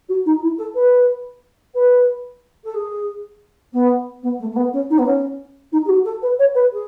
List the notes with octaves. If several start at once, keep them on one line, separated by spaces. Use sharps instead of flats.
F#4
D#4
E4
A4
B4
B4
A4
G#4
B3
B3
A3
A3
B3
C#4
D#4
B3
C#4
D#4
G#4
F#4
A4
B4
C#5
B4
G#4